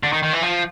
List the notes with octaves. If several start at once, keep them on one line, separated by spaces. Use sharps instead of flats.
D3
D#3
D#3
E3
F3